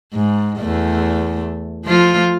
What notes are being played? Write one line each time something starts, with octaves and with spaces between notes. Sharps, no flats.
G#2
E2 A3
F3 A3 F4